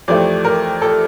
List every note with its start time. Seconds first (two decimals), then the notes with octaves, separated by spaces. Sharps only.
0.08 F2 C3 E3 A3 D5
0.45 A#4
0.82 A4